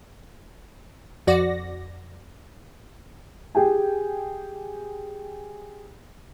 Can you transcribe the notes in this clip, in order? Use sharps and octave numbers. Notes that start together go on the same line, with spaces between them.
F2 F#4 D5 A#6
G4 G#4 G5 G#5